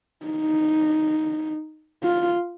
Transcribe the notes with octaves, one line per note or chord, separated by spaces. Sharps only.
D#4
F4